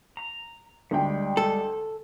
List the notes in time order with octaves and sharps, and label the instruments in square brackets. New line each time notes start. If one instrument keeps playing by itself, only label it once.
[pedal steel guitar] A#5
[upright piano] D2 G5 [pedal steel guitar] G3 G#3
[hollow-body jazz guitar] A4